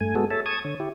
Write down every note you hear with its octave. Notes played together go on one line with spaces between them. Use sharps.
G2 A3 G#5
G#3 B3 F#4 G#4 A4
A4 C#5 E5 A5
A5 C#6 D#6 G#6
D3 C#5
E4 G4